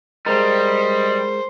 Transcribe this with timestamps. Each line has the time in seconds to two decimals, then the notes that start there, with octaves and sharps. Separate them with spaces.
0.26 G3 G#3 A#4 C5 D#5